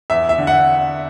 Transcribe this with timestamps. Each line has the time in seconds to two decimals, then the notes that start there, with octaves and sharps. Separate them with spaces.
0.10 E2 E5
0.29 E5
0.38 D3
0.47 F#5